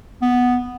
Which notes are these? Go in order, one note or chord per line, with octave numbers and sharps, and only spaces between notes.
B3